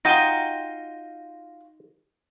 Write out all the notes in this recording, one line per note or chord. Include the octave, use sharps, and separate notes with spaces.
D#4 F4 F#4 G5 A#6 D#7 G7